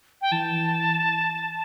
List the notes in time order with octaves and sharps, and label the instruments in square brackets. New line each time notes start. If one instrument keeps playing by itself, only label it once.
[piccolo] G5
[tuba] E3 [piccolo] A5